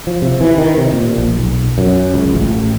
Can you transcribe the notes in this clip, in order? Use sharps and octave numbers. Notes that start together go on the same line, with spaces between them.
F3
C3
E3
D#3
C3
A#2
A#1
B1
F#2
C#2
A1